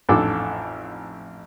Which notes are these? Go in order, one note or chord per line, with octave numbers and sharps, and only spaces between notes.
A1 F2 G#2 D4 A4 D6